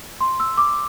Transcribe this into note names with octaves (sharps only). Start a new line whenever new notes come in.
C6
E6
D6